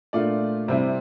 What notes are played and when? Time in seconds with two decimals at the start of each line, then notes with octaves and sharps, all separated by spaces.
0.13 A#2 A3 D4 F4 D5
0.68 C3 G3 C4 E4